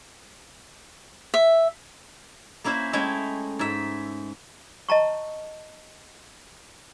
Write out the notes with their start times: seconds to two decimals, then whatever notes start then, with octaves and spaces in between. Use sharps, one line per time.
1.34 E5
2.64 A#3 C#4 E4 C5 E5
2.93 G#3 A3 C#4 E4 E5 G5
3.59 G#2 E5
4.89 D#5 A5 A#5 C#6